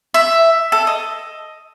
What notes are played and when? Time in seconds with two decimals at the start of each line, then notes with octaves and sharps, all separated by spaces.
0.14 E5
0.72 A4
0.87 D#5